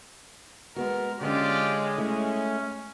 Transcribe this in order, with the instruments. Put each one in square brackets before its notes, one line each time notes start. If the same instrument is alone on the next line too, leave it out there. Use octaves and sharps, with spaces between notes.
[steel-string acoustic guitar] G#3 B3 F#4 [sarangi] A#4
[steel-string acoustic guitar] D3 C#4 [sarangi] G#3 [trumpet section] F4 G4 D5
[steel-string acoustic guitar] A3 E4 [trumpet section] C#4